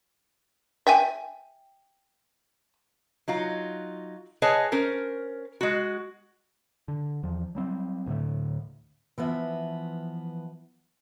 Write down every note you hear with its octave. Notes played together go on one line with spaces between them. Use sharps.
E5 G5 G#5
F#3 D#4 F4
G#4 B4 C#5 D#5 G#5 A5
C#4 A#4 C5
G#3 F#4
D3
E2 F3
F#3 G3 C4
D2 A2 D3 A3
E3 F3 B3 E5